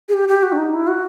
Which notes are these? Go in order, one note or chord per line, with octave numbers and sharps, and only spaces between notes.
G#4
G4
G4
F#4
D4
D#4
E4
F#4